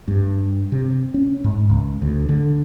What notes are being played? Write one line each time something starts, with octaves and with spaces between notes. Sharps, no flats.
G2
C3
C#4
G#2
C#2
D2
D3